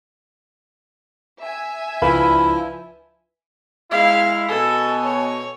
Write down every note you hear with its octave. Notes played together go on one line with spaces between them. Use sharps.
E5 G#5
C#2 F3 D4 E4 B4 F5 B5
G#3 E4 F5
B2 A4 G#5
C#5